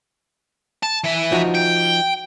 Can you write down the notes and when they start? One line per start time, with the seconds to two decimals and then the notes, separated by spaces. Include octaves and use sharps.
0.83 A5
1.04 E3 E5
1.32 F3 D#4 F#4
1.54 G5